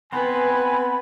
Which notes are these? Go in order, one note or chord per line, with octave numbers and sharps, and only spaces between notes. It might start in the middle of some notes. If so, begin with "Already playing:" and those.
B3 C4 B4 G#5 B5